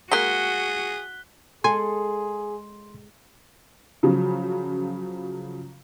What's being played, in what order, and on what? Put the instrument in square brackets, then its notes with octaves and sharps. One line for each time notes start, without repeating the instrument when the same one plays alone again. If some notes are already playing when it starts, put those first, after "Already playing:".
[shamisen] G#3 A#3 [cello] F#4 [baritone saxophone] G#4 [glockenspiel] F#6 B6 G7
[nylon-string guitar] G#3 A4 [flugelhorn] G#4 [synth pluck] G#5 [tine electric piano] C6
[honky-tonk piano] C#3 F3 F#3